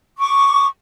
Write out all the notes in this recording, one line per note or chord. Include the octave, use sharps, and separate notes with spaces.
C#6 D6